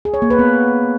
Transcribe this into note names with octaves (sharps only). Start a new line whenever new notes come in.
G#4
C#5
A#3
B4
B3